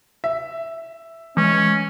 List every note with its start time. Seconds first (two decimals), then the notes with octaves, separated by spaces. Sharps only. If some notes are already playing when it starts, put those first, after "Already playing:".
0.24 E5
1.37 E3 G#3 C#4